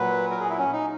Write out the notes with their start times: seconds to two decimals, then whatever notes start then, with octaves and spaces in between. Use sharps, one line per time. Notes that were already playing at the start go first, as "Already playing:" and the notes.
Already playing: A#2 F#3 B4
0.31 A#4
0.41 G#4
0.49 E4
0.59 C#4
0.73 D#4